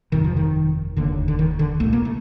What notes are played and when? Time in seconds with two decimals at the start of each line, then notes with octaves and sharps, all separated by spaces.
0.12 G1 F2 C3 D#3
0.24 F3
0.37 D#3
0.96 F1 D#2 D3
1.28 D3
1.39 D#3
1.59 D3
1.80 C2 A#2 A3
1.93 A#3
2.05 A3